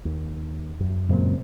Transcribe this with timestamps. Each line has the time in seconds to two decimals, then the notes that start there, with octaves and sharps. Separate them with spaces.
0.05 D#2
0.80 F#2
1.09 F#2 A#2 C#3 G#3 C4